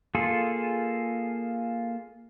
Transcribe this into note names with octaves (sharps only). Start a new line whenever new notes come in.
A#3 F4 G#4 A4